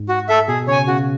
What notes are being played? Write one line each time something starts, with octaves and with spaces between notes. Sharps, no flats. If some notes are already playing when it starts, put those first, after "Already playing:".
Already playing: G#2
F#4
A4 E5
B2 G#4
C#3 C#5 G#5
C#3 F#4